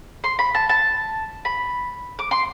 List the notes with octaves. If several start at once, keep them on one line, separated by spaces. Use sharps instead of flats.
C6
B5
A5
A5
B5
D6
C6